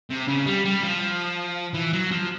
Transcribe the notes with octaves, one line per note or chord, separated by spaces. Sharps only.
C3
C#3
G3
G3
F3
E3
F#3
F3